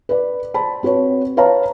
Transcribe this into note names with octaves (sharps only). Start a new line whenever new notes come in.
B4 D5
C5 A5 B5
C4 F#4 B4 C#5
B4 C#5 F5 A5 A#5